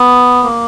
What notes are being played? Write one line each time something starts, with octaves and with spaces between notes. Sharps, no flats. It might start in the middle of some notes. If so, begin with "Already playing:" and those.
Already playing: B3
A#3